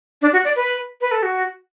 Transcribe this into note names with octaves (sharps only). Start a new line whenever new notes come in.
D4
F#4
D5
B4
B4
A4
F#4